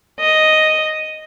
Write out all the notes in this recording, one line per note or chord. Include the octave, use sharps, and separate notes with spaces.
D#5